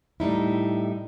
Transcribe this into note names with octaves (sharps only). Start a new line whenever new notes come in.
A2 G3 D#4 E4